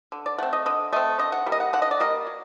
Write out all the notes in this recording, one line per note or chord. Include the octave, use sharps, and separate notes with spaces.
D3
D5
A3 C4 F#5
D#5
D3 D#5
A3 C4 D#5
D3 D#5
F#5
G3 A#3
D#5
F#5
D3 F#5
D#5
D5
G3 A#3 D#5
F#3